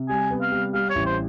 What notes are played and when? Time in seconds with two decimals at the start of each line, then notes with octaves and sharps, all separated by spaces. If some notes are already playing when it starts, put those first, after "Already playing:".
Already playing: C3
0.09 G3 G#5
0.31 B3
0.41 F5
0.52 G3
0.74 G3 F5
0.90 C#5
0.95 A1
1.06 C5